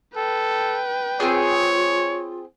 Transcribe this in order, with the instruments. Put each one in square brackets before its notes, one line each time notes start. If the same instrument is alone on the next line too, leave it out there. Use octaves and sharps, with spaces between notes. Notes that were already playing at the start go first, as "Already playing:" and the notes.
[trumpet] A4 [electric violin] B4 G5
[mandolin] C4 G#4 [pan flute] F4 [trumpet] C#5